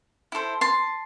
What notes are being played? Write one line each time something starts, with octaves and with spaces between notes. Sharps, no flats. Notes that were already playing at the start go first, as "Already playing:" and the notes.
E4 A4 C5
A5 C6